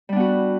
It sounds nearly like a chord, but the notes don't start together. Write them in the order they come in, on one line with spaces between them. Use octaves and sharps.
G3 D4 B3 F#4